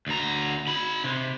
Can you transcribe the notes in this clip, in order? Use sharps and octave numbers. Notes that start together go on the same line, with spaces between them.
D2 A#5
D#4 B5
C3